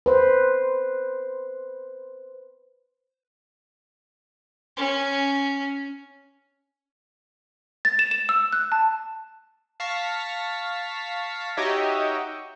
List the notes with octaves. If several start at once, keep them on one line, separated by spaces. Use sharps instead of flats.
B4 C5
C#4
A6
E7
E7
E6
F#6
A5
F5 A5 C#6 A#6 B6
D#4 F#4 G4 C#5 D#5 E5